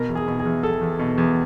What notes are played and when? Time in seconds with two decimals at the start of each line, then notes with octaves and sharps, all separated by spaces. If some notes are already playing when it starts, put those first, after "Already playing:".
Already playing: B2 A#4
0.09 E2
0.15 G#4
0.28 B2
0.39 G#4
0.46 E2
0.63 E2 A4
0.81 E2
0.99 B2
1.18 E2